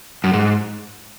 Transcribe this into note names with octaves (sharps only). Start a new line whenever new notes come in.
F#2
G#2